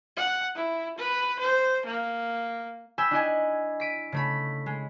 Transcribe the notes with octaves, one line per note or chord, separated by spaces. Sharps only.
F#5
E4
B4
C5
A#3
G5 G#5 B5 E6
D4 E4 D#5 G#5
B6 D7 D#7
C#3 A3 B5
G#3